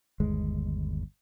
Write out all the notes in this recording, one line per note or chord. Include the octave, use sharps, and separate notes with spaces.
G1 D#2 G#3